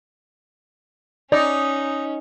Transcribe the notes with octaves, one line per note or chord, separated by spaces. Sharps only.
C#4 D#4 D5